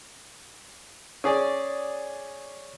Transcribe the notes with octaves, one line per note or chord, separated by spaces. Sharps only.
C#4 G#4 D5